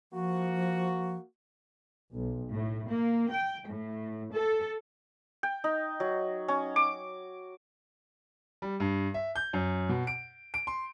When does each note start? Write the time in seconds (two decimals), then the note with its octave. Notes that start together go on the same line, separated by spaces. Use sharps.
0.12 F3 A#3 F#4
2.12 B1
2.51 A2
2.88 A#3
3.29 G5
3.68 A2
4.33 A4
5.43 G5
5.64 D#4
6.00 F#3
6.48 C#4
6.76 D6
8.62 G3
8.80 G2
9.14 E5
9.35 G6
9.53 F#2
9.89 B2
10.07 D7
10.54 D7
10.67 C6